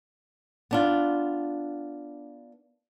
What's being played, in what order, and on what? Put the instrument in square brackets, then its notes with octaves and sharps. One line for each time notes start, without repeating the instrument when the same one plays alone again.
[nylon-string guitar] B3 D4 F4